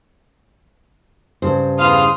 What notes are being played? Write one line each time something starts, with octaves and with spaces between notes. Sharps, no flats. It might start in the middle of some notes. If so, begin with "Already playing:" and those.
G2 C#3 C5
E2 F5 C6 D#6